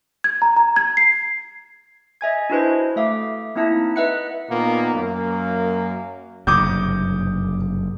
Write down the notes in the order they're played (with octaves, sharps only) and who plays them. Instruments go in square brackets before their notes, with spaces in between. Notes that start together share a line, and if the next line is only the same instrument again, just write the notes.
[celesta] G#6
A#5
A#5
G#6
C7
[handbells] D#5 E5 G#5 G#6
D4 E4 F#4 B4 C5 D#5
A3 E5 F5 D6
A#3 C4 D#4 E4 E5 A5
B4 D#5 E5 F#5 F#6 C#7
[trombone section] A#2 D#3 A#3 B3
F#2 A#3
[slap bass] F#1 G2 C3 [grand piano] D6 D#6 G6